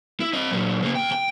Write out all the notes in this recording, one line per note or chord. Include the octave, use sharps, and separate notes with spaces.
E4
C4 D#5
A#2 F#3
C#3 A#3
D#2 G5
G5